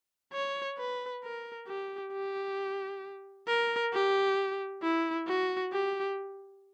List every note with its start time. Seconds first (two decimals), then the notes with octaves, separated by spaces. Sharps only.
0.33 C#5
0.78 B4
1.23 A#4
1.68 G4
2.13 G4
3.48 A#4
3.93 G4
4.83 E4
5.28 F#4
5.73 G4